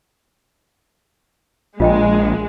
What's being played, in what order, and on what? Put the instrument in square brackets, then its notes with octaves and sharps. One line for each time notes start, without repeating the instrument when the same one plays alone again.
[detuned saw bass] A#1 [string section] G#3 [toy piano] F4 D#5 G5